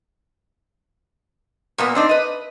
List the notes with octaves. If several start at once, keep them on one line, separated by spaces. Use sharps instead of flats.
A#2 A#3 B3
C4 D4 D#4
B4 D#5